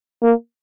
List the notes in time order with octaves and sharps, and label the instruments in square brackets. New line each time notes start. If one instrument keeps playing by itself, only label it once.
[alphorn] A#3